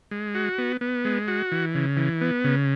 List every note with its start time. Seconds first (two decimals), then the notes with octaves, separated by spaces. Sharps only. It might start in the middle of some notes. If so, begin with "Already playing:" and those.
0.11 G#3
0.35 F#4
0.58 B3
0.81 B3
1.05 G#3
1.28 F#4
1.52 E3
1.75 C#3
1.97 E3
2.21 B3
2.44 C#3